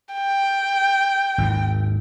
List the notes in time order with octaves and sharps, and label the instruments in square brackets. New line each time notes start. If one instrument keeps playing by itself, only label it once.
[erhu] G5
[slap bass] G#1 D#2